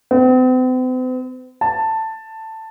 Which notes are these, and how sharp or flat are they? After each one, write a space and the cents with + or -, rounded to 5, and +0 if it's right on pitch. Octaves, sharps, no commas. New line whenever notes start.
C4 -45
A5 +10